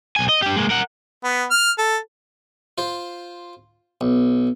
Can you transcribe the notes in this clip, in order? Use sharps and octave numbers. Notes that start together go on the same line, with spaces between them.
B1 G#5
D#5
D4 G4
G#3 A#3
A#4 F#5
B3
F6
A4
F4 C5
B1